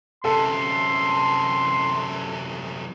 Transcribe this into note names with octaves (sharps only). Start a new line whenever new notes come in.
F#2 C3 A4 C6